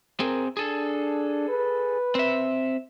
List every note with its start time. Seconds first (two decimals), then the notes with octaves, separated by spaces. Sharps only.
0.20 C4 G#4 A#4
0.57 D4 G#4 A4
1.49 B4
2.15 C4 E5